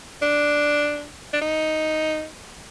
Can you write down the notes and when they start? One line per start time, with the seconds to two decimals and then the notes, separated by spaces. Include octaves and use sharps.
0.22 D4
1.33 D4
1.41 D#4